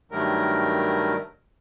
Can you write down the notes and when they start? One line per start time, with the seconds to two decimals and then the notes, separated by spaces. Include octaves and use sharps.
0.12 G2 D#3 F#3 G3 A3 A#4